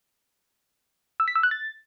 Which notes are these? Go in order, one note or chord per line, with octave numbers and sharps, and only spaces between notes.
E6
B6
E6
F#6
A6